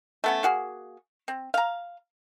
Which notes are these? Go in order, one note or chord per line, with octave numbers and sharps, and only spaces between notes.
A3 B3 C#4
A#3 F#4 G#4
C4
F5 A#5